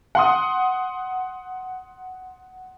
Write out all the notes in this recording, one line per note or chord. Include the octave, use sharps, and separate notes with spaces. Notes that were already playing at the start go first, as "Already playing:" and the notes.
F#5 C6 D#6